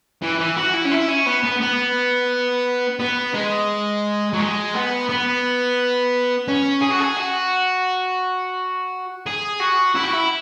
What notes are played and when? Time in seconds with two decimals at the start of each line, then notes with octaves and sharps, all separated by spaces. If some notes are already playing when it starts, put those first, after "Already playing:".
0.22 E3
0.39 E3
0.57 F#4
0.74 E4
0.85 C#4
0.92 E4
1.09 C#4
1.26 B3
1.44 B3
1.61 B3
2.99 B3
3.34 G#3
4.33 F#3
4.39 G#3
4.74 B3
5.09 B3
6.48 C#4
6.82 G#4
6.91 F#4
7.00 G#4
7.17 F#4
9.26 G#4
9.60 F#4
9.95 E4
10.04 F#4
10.13 E4